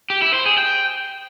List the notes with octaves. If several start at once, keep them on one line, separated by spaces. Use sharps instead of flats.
G4
E4
C5
G#4
G5